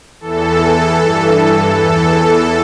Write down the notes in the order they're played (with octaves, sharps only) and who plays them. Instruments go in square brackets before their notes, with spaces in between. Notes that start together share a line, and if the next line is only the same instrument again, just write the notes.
[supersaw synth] E2 E3 A4
G2 E3
E2 E3 A4
A4